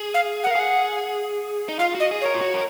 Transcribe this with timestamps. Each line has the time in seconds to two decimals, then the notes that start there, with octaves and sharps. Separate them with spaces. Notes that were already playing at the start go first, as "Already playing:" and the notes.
Already playing: G#4
0.14 F5
0.43 F#5
0.47 A#4
0.51 F5
0.55 G#4 F#5
1.69 D#4
1.79 F4 F5
1.95 F#4
2.00 D#5
2.11 G#4
2.21 A#4 C#5
2.34 F4
2.41 F#4
2.54 A#4